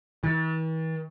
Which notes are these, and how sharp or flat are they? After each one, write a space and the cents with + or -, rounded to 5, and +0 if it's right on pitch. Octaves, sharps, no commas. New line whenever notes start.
E3 -45